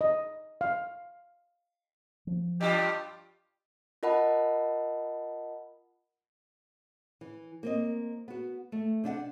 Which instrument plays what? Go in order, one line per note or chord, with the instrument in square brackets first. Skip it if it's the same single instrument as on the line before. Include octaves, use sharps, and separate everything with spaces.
[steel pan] D#5
F5
[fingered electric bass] F3
[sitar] G2 F4 [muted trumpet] G4 [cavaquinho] D#5
[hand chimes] F4 A#4 D#5 F#5 A5 B5
[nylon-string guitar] E3
A#3 C4 D#5
B3 F#4
A3
C3 D4 E5 F#5